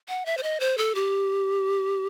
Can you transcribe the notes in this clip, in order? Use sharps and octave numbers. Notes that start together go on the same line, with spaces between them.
F#5
E5
C5
D#5
C5
A4
G4